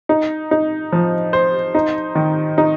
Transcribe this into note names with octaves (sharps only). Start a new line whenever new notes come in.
D#4
D#4
F3
C5
D#4
D#3
D#4